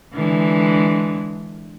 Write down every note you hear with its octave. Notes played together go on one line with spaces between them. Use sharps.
D3 E3 G#3